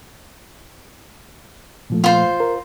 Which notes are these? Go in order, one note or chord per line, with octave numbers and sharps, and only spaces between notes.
A#2 F3 A3
F4 C5
A#4